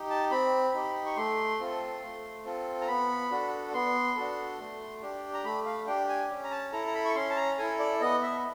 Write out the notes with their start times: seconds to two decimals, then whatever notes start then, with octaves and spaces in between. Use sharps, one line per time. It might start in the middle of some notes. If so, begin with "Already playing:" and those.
Already playing: D#4 G4
0.10 A5
0.31 C4 B5
0.74 D#4 G4
1.06 C#6
1.16 A3 C6
1.60 C4 F4 A4
2.02 A3
2.45 C4 F4 A4
2.81 A#5
2.88 B3 B5
3.31 D4 F#4 A4
3.74 B3 C6
4.16 D4 F#4 A4
4.59 A3
5.02 D4 G4
5.34 A#5
5.44 A3 B5
5.66 F5
5.87 D4 G4 G5
6.09 G#5
6.29 C#4
6.44 A#5
6.51 A5
6.72 E4 A4 A#5
6.87 A#5
6.95 B5
7.05 C#6
7.15 C#4 C6
7.30 A5
7.36 A#5
7.58 E4 A4 G#5
7.79 D5
8.01 B3 D#5
8.22 E5